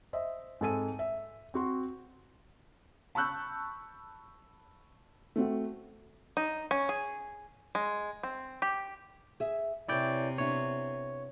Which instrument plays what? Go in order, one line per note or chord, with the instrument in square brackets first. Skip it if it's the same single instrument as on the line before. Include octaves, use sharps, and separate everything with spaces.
[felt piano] C5 D#5 E5
G#2 C4 A4 G#5 D#7
E5
C4 F#4 C6
A5 B5 C#6 E6 F#6 G6
A3 C4 F#4
[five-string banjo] D#4
C#4
G#4
G#3
C4
G4
[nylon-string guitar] G#4 E5
[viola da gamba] C3 [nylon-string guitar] C#4 B4 C#5 [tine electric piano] E4 D5 G5
[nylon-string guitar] B3 D4 E4 [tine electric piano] C#5